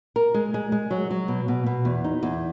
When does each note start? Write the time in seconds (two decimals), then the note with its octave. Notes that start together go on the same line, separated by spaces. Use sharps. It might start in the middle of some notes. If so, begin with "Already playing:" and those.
0.16 A#4
0.34 G#3
0.54 G#3
0.72 G#3
0.91 F#3
1.11 F#3
1.28 B2
1.48 B2
1.66 B2
1.85 E2
2.04 D#4
2.23 E2